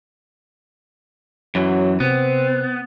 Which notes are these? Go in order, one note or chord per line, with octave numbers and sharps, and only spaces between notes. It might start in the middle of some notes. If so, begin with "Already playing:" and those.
F#2 E3 F#3
C3 B3 C4